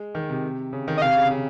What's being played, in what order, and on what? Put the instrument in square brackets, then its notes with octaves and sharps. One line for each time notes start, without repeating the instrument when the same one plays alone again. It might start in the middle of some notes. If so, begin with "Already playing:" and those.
Already playing: [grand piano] G#3
D#3
C3
C#3
D#3
[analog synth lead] D#5
[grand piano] C3 [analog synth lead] F5
[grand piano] C#3
C#3